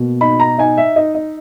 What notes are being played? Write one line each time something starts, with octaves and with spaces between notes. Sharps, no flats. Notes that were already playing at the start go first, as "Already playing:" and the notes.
Already playing: B2 A#3
D#4 B5
A#5
D#4 G#5
E5
D#4 D#5
D#5